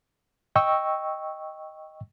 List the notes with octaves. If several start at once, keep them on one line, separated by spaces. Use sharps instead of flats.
D#5 G5 C#6 E6